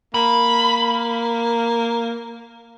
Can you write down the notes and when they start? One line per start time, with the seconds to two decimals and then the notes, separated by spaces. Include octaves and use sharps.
0.14 A#3 B5